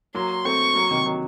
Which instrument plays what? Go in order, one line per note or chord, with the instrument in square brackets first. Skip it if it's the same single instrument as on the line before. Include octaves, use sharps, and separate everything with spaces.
[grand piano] F#3 A#3 [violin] C6
[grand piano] A3 C4 [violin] C#6
[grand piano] F#3 A#3
C3 D#3
D#3 F#3